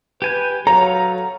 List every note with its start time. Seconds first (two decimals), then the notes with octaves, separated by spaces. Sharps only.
0.22 G4 B4 G#5 G6
0.67 F#3 A4 C#5 F5 A#5